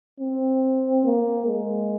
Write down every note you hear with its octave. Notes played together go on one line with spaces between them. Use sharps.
C4
A#3
G#3